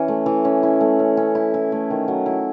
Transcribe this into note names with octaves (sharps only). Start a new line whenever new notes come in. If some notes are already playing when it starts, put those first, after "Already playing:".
Already playing: E3 C#4
A3
E3
C#4
E4
A3
C#4
C#4
E4
E4
A3
D#3
F#3
E4